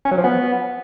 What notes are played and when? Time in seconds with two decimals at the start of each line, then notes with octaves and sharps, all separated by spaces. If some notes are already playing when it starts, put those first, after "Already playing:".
0.05 C#4
0.11 F#3
0.18 F3
0.24 B3